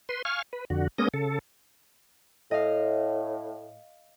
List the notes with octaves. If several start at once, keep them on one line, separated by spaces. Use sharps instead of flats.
B4 C6
F5 G#5 C#6 F6
B4
F2 D3 F#4
G#3 A#3 B3 C#4 D#6 A#6
C#3 A4
A2 D#5 F5